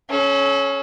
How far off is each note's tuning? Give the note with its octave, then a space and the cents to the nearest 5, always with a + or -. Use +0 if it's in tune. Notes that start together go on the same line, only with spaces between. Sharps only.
C#4 +0 A4 -35